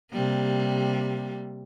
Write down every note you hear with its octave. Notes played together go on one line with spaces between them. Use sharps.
C3 G3 A#3